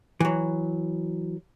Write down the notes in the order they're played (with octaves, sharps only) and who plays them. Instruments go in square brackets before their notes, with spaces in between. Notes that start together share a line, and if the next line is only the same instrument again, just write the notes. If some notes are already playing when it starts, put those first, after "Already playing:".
[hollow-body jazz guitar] E3 F#3